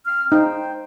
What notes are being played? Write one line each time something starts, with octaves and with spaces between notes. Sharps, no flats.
C4 F6
D#4 C5 G5